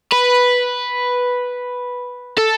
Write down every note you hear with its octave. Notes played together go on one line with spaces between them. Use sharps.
B4
A4